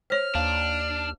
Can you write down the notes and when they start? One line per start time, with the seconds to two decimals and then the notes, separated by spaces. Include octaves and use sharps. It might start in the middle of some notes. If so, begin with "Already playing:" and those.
0.10 C5 C#5 F6
0.35 D#2 D4 F5